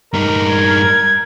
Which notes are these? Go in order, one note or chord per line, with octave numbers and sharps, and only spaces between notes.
G2 D#4 A#4 A#5
G#6